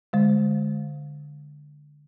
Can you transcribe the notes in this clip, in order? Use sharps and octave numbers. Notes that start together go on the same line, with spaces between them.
D3 G#3